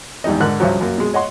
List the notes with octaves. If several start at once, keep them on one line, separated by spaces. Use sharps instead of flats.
E2 G#2 G3 D#4 D#5
G#2 D3 A#4 F#6
C2 G2 C#3 F3 F#3
F#2 A#3
B2 G#3
C#5 D#5 F#5 C6